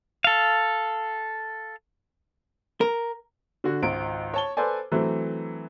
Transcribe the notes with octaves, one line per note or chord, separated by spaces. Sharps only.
A4 F5
A#4
D3 F#4
G#1 C#2 D7
C#5 A5 G7
A4 B4 C5 D5 G#5
E3 F#3 A3 C4